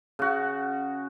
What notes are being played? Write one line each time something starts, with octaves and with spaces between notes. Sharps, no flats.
C#3 F#4